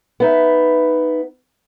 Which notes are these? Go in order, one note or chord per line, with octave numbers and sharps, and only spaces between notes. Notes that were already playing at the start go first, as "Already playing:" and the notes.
B3 D#4 E5